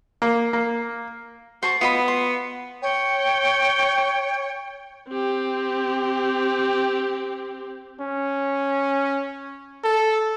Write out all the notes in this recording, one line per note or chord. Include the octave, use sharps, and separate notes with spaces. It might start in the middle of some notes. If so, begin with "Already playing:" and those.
A#3
A#3
F#4 C5 A5 C#6
B3 F4 D#5 B5
C6
C#5 G5
C4 G4
C#4
A4